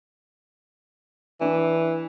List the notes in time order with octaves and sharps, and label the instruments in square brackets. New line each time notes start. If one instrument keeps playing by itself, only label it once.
[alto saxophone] E3 [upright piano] D4